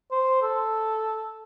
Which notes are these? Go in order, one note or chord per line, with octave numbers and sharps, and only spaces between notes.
C5
A4